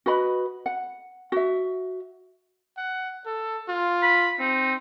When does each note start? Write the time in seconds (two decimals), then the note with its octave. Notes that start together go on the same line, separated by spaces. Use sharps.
0.06 F#4 B4 D#5 B5
0.66 F#5
1.32 F#4 E5
2.77 F#5
3.26 A4
3.68 F4
4.02 B5
4.39 C4 D#4